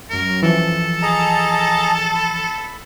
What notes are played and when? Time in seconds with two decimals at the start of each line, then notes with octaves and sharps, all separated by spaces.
0.10 F#2 A#4
0.43 E3 F3 A4
1.02 G#4 D#5 A5 A#5
2.14 B5